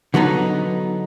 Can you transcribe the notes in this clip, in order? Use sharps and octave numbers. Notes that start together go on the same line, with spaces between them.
D3 F#3 B3 D#4